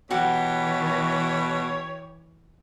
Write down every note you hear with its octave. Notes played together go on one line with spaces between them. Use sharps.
B2 E3 F#4 G4 C#5 F#5